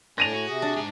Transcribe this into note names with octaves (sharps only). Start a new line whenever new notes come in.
A2 D4 G#5 A#6 D#7 F7
F#4
C3 G#4
D4
G#2 G#5